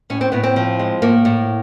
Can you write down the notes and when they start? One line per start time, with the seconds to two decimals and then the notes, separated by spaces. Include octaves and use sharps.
0.10 A2 C#4
0.21 C4
0.32 A2 B3
0.43 C4
0.56 F3
0.79 G#3
1.02 A2 A#3
1.25 A2